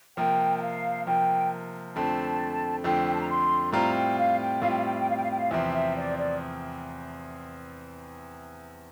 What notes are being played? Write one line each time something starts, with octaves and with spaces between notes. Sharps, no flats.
C3 F3 A#3 G5
G5
F5
C3 F3 A#3 G5
F2 D3 A3 C4 A5
F2 D3 A3 C4 G5
G5
A5
A#5
C6
A2 G3 C4 F4 A#5
G5
F5
G5
A2 G3 C4 F4 F5
G5
F5
G5
F5
G5
F5
G5
F5
G5
F5
E2 C3 F3 C4 E5
E5
D5
D5